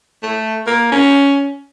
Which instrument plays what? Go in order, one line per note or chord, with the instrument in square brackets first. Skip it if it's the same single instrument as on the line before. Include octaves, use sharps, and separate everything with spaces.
[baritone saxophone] A3
A#3
C#4